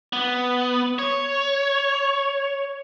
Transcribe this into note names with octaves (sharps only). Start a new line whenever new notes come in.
B3
C#5